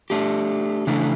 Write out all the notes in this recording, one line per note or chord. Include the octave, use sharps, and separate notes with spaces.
A3 D4 G4
C#3 E3 A3 D4